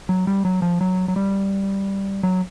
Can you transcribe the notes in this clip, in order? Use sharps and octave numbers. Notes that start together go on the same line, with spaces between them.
F#3
G3
F#3
F3
F#3
F#3
G3
F#3